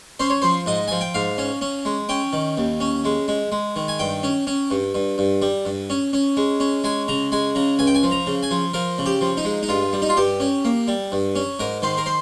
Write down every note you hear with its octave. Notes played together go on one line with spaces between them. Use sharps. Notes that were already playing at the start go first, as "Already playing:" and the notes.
C#4 C5
C#5
F3 C5
G#2 D#5
F3 G#5
G5
G#2 F5
C#4
C#4
G#3
C#4 G5
D#3
D#2
C#4
G#3
G#3
G#3
D#3
G#5
G2 G5
C#4
C#4
G2
G2
G2
G3
G2
C#4
C#4
G#3
C#4
G#3 G#5
C#3 A#5
G#3 G#5
C#3 A#5
C#2 G#5
G5
G#5
F3
A#5
C#3
G#5
F3
F3 A#4
C#3
G4
F3
D#4
G#3
D#4
G2 F4
G3
D#4
F4
G2 G4
C#4
A#3
G3
G2
C#4
G#2 A#4
D#3 C5
A#4
C5